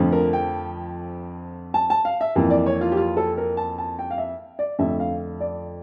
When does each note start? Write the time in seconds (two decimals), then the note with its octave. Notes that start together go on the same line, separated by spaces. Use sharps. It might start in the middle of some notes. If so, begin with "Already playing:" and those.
Already playing: F2 D3 F3 A3
0.12 A#4
0.33 G5
1.74 A5
1.90 A5
2.05 F5
2.21 E5
2.35 F2 E3 A#3
2.50 D5
2.66 C#5
2.81 F4
2.92 G4
2.97 F4
3.17 A4
3.38 A#4
3.57 A5
3.78 A5
3.99 G5
4.11 F5
4.18 E5
4.59 D5
4.79 F2 D3 A3 E5
5.00 F5
5.40 D5